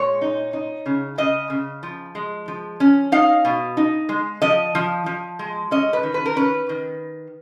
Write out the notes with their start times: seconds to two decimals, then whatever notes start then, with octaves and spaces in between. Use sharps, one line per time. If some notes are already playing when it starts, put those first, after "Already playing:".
Already playing: A#2 G#3 C#5
0.21 D#4
0.53 D#4
0.86 C#3
1.18 C#3 D#5
1.50 C#3
1.83 F3
2.15 G#3
2.48 F3
2.80 C#4
3.12 D#4 F5
3.45 B2
3.77 D#4
4.09 G#3
4.42 F3 D#5
4.75 F3
5.06 F3
5.39 G#3
5.71 C#4 D#5
5.93 B4
6.03 D#3
6.14 B4
6.26 A#4
6.36 C#4 B4
6.69 D#3